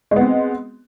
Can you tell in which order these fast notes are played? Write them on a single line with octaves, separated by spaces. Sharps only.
G#3 B3 C4